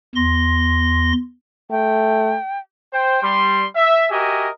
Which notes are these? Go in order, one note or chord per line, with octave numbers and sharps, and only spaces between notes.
E2 C6 A#6
A3 G5
C5 G5
G3 C6
E5
F#4 G4 A#4 D#5 E5 G#5